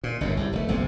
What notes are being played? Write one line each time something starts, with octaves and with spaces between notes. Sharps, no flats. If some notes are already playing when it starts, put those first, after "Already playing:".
A#2
G1 F#2 A2
C2 G2
F1 A3
F#1 B1 G#2 C3